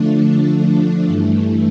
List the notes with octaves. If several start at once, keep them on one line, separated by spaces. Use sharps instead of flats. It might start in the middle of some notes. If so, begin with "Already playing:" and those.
Already playing: D3 F3 A3 D4
G2 E3 A3